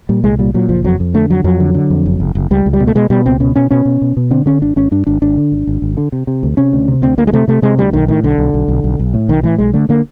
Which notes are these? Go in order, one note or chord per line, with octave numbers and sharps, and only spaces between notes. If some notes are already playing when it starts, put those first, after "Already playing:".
A#2 G3
C2 G#3
A#2 G3
A#2 F#3
F#1 F3
F2 F#3
F2
D3 A3
F2 F#3
F2 F#3
D3
D3
F2
F#1
F#1
F#1
C#2 G3
C#2
G3
B2
A3
B2 G#3
B2 G3
C#2 C4
B2 C#4
B2 C#4
B2 C#4
B2
B2
B2
D3 C4
D3 C#4
G#1 D4
G#1 C#4
G2 D4
G#1 D4
G#1 D4
D3
G#1
G#1
G#1
D3
C3
C3
D2
C3 C#4
D2
C3
D2 C4
D2 A#3
G#3
C3 A3
C3 A3
C3 G#3
D2 G3
B1 D#3
A2 D#3
B1 D3
B1
B1
B1
B1
B1
A2
B1 D#3
A2 E3
B1 G#3
D3 A3
D3 A#3